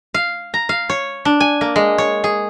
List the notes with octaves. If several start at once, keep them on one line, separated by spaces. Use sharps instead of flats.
F5
A#5
F5
C#5
D4
G#5
A#3
G#3
C#5
G#4